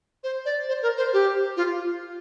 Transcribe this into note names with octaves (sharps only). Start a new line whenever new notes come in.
C5
D5
C5
A#4
C5
G4
F4